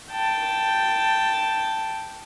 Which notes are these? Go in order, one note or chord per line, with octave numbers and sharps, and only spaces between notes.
G5 A5